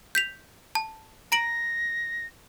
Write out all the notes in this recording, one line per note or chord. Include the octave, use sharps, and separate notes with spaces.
G6 B6 F7
A5
A#5 A#6 D7 F#7